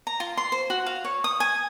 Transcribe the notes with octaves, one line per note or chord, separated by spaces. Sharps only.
A#5
F4
C6
C5
F#4
F5
C#5
D#6
G#5